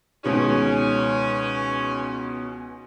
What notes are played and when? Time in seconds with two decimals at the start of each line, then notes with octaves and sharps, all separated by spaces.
0.24 C#2 B2 D#3 C#4